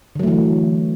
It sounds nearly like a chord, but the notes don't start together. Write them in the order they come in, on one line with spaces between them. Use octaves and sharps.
D3 F#3 A3 E3